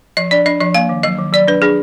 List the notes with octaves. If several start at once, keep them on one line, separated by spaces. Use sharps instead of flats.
F3 D#5
D4 D5
D4 D#5
F3 D#5
A#3 F5
D#3
F#3 D#5
D#3
F#3 D5
D4 B4
D4 G#4